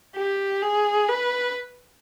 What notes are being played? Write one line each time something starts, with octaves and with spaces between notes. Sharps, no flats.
G4
G#4
B4